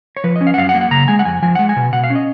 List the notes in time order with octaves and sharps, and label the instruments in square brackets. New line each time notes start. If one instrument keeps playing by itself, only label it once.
[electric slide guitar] C#5
F3 B4
D#5
C#4
F5
F#5
F#2 F5
F#5
A#3
F#5
C#3 A#5
G#3 G#5
F#5
F2 G#5
F3 G#5
G#3 F#5
G#5
B2
B2 F#5
F5
C#4
D#5